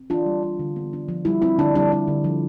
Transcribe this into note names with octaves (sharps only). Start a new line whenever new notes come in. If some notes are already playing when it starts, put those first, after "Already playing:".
Already playing: C4
E3 D4 F4
G3
D4
D3
B3
D4
F3
G3 E4
C4 E4
D3 D4
G3 D4
D4
D3
F3